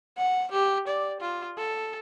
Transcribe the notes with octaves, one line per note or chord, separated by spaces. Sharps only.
F#5
G4
D5
F4
A4